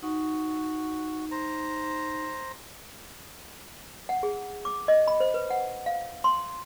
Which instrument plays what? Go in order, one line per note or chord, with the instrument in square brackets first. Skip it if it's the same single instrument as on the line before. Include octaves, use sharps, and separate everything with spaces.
[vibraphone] D#4 [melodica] F#4
[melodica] C5 A#5
[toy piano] F#5
G#4
D6
D#5
B5
C5
B4
F#5
F5
C6